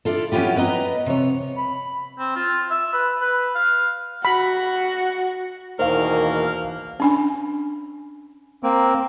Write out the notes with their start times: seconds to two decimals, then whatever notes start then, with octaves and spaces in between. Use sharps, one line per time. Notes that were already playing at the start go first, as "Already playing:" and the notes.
0.05 D4 E4 F4 A4
0.32 F#3 B3 C#4 E4 F4 G4
0.56 B3 B4 D#5 A#5
1.06 C3 C#5
1.57 B5
2.19 C4
2.36 F4
2.70 E5
2.93 B4
3.21 B4
3.55 F5
4.25 F#4 B5
5.79 E2 B2 D#3 A#3 C5 F5 F6
7.00 C#4 D4 G#5
8.63 A#3 C4